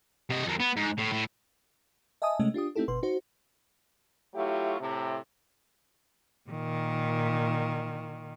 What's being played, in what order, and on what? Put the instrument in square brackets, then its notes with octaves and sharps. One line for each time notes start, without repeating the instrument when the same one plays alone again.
[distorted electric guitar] C3 D#5
F2 A#3
B3
G#2
A2
A2
[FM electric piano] D#5 E5 G#5 A5 D#6
C3 G#3 A3 C#4 D#5
D4 F4 G4 D#6
A3 C4 D#4 E4 G4 A4
G1 B2 B4 C6
D#4 F#4 C5
[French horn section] F#3 A3 E4 F4 G4
A2 C3
[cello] A#2 D#3